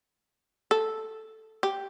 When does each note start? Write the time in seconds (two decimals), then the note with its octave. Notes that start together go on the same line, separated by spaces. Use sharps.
0.71 A4
1.63 G4